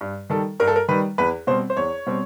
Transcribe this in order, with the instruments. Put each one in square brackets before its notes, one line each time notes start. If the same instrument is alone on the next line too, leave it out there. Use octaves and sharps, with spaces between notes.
[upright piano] G2
D#3 G3 A4
G2 A#4
A4
A#4
D#3 G3 B4
E2 B4
B2 G3 C4 C5
C5
E2 C#5
B2 G3 C4